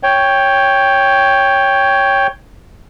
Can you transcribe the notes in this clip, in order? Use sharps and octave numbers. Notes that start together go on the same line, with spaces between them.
C#5 G5